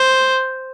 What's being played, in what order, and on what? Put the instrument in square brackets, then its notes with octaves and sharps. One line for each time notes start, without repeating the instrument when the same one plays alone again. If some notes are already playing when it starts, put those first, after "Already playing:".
Already playing: [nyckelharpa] C5